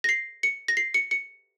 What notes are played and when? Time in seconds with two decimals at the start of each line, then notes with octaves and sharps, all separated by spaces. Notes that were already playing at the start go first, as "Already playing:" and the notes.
0.04 A#6
0.09 C7
0.43 C#7
0.68 A#6
0.77 C7
0.94 C#7
1.11 C#7